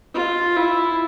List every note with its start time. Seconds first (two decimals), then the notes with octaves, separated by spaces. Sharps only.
0.15 F4
0.56 E4